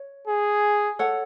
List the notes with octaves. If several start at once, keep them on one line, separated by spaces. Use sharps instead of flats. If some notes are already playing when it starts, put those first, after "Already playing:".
Already playing: C#5
G#4
A4 C#5 F#5